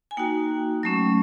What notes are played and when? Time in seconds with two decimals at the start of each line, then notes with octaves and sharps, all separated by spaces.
0.11 G#5
0.17 A#3 D#4 F#4 G5
0.83 F#3 A3 C#4